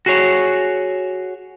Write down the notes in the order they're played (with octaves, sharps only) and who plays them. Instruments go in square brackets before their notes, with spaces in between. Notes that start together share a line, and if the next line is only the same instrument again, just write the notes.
[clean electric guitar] F#4 G#4 C#5